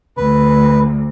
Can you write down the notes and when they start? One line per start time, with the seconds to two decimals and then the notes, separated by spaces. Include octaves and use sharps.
0.17 D2 B4